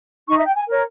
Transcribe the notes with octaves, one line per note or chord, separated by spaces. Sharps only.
D#4 C#6
E5
G5
G#5
A#4 C#5